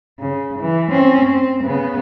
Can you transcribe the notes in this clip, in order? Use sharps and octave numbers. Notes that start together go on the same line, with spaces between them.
C#3
E3
C4 C#4
C4
C#3 B3